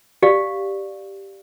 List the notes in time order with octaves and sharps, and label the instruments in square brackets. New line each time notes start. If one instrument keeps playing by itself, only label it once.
[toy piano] G4 D5 F5